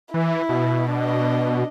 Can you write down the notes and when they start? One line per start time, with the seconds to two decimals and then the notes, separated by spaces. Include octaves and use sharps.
0.14 E3 E4
0.49 B2
0.91 D4 D#5